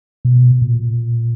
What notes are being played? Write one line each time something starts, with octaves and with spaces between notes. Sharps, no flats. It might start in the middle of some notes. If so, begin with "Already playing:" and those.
B2
A#2